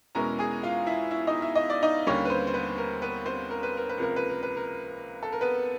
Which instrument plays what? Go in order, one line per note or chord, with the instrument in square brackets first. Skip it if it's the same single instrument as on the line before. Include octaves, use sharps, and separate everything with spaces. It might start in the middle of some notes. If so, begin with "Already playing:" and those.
[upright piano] E2 B2 G#3 C#4 E4 A#4 A#5
G#4 G#5
F4 F5
E4 E5
E4 E5
D#4 D#5
E5
D#5
D5
D#4 D#5
D#2 D3 G3 A#3 C#4 C#5
B4
C4 C5
C5
B3 B4
A#4
B3 B4
C4 C5
A#4
B4
A#4
B4
C#2 C3 F3 A#3 A#4
B4
A#4
B4
A#4
A4
A#4
B3 B4